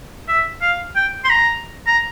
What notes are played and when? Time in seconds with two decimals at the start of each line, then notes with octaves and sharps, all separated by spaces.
0.28 E5
0.62 F5
0.96 G5
1.25 C6
1.30 A#5
1.87 A#5